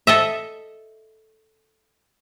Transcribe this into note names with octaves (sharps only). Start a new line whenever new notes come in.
A4 D#5 E5